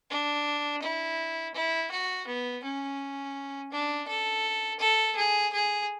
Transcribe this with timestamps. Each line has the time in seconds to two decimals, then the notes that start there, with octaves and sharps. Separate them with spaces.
0.10 D4
0.82 E4
1.54 E4
1.91 F#4
2.27 B3
2.64 C#4
3.72 D4
4.08 A4
4.80 A4
5.16 G#4
5.53 G#4